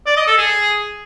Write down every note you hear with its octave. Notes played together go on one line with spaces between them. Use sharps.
D5
D#5
A4
G#4